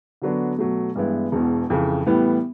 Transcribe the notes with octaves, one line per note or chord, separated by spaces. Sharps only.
D3 F#3 B3 D4 F#4
B2 F#3 A3
G2 E3 G#3 B3 E4
E1 E2 B2
F2 C#3 E3
A2 E3 G3 B3